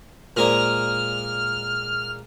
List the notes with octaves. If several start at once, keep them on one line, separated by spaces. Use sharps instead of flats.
A#2 G#3 A#3 A#4 C5 D5 F6